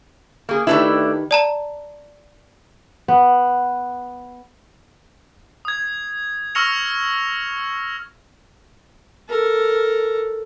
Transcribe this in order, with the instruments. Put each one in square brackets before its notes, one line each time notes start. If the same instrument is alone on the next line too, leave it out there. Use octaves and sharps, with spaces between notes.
[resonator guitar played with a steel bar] A#3 G#4
[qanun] D#3 G4 B4 [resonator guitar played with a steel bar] A3 D4 E4
[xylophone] D5 A5 A#5
[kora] B3
[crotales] D#6 G#6
C#6 E6 F6 A#6 C#7 F7
[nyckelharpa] A4 A#4